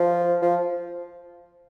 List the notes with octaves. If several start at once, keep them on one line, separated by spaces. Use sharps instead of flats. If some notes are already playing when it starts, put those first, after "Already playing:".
Already playing: F3
F3